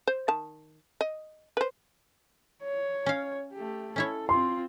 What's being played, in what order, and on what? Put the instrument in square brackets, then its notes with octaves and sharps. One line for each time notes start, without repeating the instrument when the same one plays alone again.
[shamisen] C5
D#3 A5
D#5
B4 C5
[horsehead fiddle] C#5
[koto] C#4 F5
[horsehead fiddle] A3 G4
[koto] C#4 E4 C#5 [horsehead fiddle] A4
[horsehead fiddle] C4 F4 [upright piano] C6